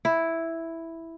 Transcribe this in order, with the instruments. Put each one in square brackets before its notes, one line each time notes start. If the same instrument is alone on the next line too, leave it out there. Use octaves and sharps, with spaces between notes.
[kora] E4